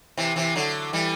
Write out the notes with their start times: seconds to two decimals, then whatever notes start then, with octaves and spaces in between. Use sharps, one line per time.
0.17 C3 E3
0.36 C3 E3
0.55 D3 F#3
0.93 E3 G3